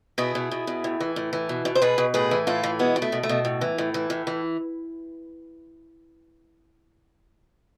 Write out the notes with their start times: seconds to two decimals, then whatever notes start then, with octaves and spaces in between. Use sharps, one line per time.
0.18 B2 E4 G#4
0.35 B2
0.51 B2
0.67 B2
0.84 A2
1.00 E3
1.16 A2
1.33 E3
1.49 B2
1.65 B2
1.75 C5
1.82 B2 G#4 B4
1.98 B2
2.14 A2 G#4 B4
2.31 E3
2.47 A2 F4 A4
2.63 E3
2.79 B2 G#3 B3
2.96 B2
3.02 A3
3.12 B2
3.23 A3
3.29 B2
3.45 A2
3.61 E3
3.78 A2
3.94 E3
4.10 A2
4.27 E3